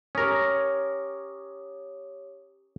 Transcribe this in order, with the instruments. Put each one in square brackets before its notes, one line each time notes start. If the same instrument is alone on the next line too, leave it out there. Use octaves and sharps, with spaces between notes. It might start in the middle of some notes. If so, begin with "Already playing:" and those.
[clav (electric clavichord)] C#4 A#4 [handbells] G4 C#5 D#6